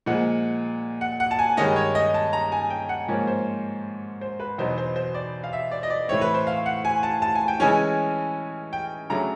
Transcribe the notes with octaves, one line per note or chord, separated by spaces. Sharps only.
A#2 F3 G#3 F#5
F#5
F#5
A5
G#5
G2 D#3 G#3 C#4 D#5
C#5
D#5
A5
A#5
G#5
G5
F#5
G#2 F3 A#3 C#4
C5
C5
B4
E2 B2 F#3 B3 D#4 C5
C5
C5
D5
F5
E5
D5
D#5
D5
A2 E3 A3 C4 C#5
B4
C5
F5
F#5
G#5
A5
A5
G#5
G5
C#3 E3 G#3 C#4 G#5
G5
C#3 F#3 A3 D4 A#5